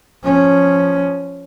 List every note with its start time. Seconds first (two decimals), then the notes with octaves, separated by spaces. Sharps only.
0.24 F3 C#4